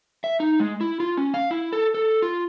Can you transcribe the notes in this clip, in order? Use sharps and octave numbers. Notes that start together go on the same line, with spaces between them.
E5
D#4
G#3
E4
F4
C#4
F5
E4
A4
A4
F4